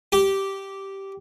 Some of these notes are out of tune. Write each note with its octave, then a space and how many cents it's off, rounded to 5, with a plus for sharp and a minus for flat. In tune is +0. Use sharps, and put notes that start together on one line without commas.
G4 -10